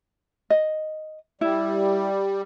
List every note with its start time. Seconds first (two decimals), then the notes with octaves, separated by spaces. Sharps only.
0.50 D#5
1.41 G3 E4